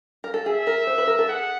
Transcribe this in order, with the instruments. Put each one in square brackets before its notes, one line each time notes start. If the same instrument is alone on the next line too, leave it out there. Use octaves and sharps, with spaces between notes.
[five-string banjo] A#4
A4
[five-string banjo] G#4 [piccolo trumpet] E5
[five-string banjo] A#4
C5
B4
A#4
A4
[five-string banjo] G#4 [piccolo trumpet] F#5